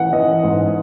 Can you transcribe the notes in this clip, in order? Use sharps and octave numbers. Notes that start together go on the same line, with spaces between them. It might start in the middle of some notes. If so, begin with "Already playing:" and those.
Already playing: A1 E3 F#5
E3 D#5
G#2